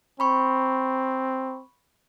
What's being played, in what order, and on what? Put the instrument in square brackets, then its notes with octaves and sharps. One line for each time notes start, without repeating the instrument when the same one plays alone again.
[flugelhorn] C4 [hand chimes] B5 C#6